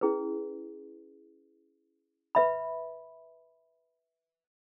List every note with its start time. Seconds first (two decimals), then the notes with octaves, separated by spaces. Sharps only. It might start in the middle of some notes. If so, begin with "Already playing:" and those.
0.01 C#4 E4 G#4 B4
2.35 B4 E5 B5